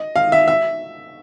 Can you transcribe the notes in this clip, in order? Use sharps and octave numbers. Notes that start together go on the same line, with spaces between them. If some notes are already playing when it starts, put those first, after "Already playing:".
Already playing: D#5
F5
E5
E5